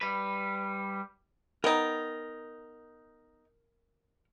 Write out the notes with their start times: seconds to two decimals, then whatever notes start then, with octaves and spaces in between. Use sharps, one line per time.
0.01 G3 B4
1.64 B3 D#4 A#4 G5